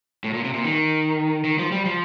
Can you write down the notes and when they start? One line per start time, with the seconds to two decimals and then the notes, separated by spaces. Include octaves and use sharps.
0.24 A2
0.34 A#2
0.44 C3
0.54 A#2
0.65 D#3
1.44 D#3
1.59 F3
1.72 G3
1.85 F3